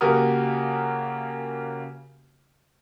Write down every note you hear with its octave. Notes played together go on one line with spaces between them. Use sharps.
C#3 A#3 F#4 G4 A#4 D#6